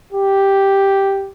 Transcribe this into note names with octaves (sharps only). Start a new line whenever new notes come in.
G4